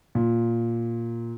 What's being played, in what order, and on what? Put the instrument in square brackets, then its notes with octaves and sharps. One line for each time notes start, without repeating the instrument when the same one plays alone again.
[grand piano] A#2